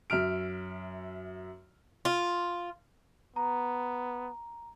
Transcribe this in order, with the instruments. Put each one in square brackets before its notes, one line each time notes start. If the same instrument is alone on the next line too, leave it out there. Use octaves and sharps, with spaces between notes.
[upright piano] F#2 E5 F6 D7
[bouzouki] F4
[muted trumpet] B3 [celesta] A#5